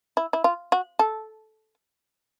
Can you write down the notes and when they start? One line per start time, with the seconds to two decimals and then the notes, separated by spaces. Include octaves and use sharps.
0.17 E4
0.33 E4
0.44 F4
0.72 F#4
0.99 A4